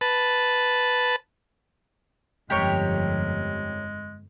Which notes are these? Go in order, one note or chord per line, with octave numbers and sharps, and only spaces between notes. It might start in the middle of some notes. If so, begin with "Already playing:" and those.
B4 A5
G1 F2 G#3 G4 A#4 C#5